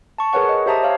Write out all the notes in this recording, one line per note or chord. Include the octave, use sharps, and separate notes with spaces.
A5 C#6
G#4 A#4 B4 C#5 F#5 C#6
D#5
G4 C5 E5 A5 A#5 D#6
C#5 E5 F5